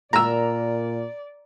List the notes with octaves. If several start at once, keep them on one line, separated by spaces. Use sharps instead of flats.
A#2 A#4 D5 A#5 E6